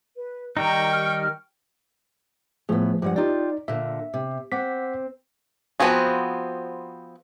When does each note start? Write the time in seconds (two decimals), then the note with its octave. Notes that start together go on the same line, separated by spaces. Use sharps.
0.15 B4
0.57 D#3 G3 D#4 G5 A#5 C#6
0.91 G4 F6
2.69 A2 F3 A3 B3 G#4
3.02 G2 F3 G3 G#3 F#5
3.16 D#4 F4 G4 D5
3.68 A#2 D3 E5
4.14 C3
4.52 C4 F#5 D6 B6
5.80 F3 B3 C4 F#4 G#4